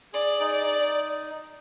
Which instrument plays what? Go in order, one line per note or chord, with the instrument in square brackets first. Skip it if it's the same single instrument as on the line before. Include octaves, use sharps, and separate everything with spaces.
[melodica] G#4 [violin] D5
[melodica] D#4
[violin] D5
[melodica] D#4